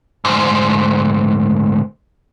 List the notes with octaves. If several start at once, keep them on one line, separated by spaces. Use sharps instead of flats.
D2 G#2